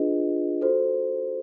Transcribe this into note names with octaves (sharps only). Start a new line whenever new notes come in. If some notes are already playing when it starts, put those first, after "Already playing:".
Already playing: D4 F4 G#4 B4 D#5
F#4 A4 C5